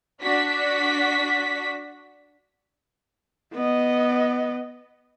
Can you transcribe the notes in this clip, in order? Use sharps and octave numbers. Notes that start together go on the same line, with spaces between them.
D4 F#4 B6
B3 D#5